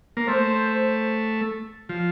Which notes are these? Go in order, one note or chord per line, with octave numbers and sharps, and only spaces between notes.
A#3
A3 C5
F3